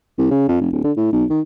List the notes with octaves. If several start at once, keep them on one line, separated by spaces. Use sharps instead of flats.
C2
C#3
F2
F1
D1
D3
A2
B1
D#3